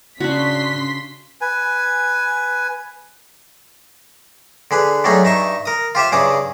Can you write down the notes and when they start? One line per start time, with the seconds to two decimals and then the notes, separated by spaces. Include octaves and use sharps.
0.20 C#3 D4 F#4 C6 B6
1.41 B4 G#5
4.71 D3 G#4 B4
5.04 F#3 G3 A3 D#4 G#4
5.24 G2 D#4 E5 C#6
5.66 A#4 D#6
5.95 F4 G4 C5 E5
6.12 G2 C#3 G#4 D6 D#6